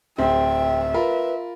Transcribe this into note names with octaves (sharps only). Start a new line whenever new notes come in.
D1 C4 E5 G5
F4 A#4 B4 B5